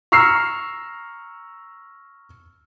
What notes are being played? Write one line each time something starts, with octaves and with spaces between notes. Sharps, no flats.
A#5 C#6 E6 F6 C7